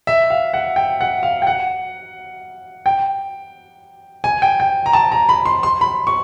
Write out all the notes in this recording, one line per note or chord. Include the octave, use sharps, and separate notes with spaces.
E5
F5
F#5
G5
F#5
F5
G5
F#5
G5
G#5
G5
G5
A#5
A5
A#5
B5
C6
C6
B5
C#6